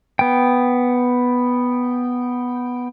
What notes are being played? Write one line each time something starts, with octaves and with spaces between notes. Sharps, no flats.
B3 G5